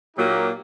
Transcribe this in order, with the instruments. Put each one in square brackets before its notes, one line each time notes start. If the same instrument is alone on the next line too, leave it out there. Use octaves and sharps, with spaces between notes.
[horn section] A#2 F#3 A#3 D#4 G4